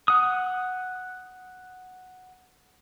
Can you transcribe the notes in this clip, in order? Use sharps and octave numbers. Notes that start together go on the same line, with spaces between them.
F#5 D#6